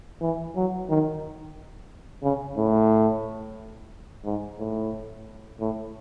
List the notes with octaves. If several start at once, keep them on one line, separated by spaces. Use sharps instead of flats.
E3
F#3
D#3
C#3
A2
G#2
A2
A2